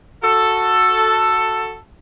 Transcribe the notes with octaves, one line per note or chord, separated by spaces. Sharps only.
F#4 A4